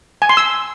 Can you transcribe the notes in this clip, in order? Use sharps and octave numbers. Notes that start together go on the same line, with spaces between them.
G#5
C6
E6